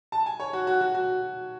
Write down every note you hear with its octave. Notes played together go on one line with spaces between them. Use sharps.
A5
G#5
C#5
F#4
F#4
F#4
F#4